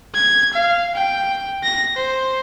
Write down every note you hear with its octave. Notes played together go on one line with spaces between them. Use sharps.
G#6
F5
G5
A#6
C5